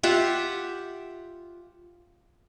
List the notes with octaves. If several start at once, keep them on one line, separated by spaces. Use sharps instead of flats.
F4 G4 E5 F#5